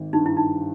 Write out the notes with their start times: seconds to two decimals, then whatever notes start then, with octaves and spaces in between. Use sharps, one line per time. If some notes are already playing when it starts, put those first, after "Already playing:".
Already playing: G#1
0.13 G2 D#4
0.26 E4
0.37 D#4